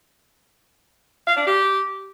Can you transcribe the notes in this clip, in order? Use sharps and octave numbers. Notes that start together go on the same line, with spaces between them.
F5
D4
G4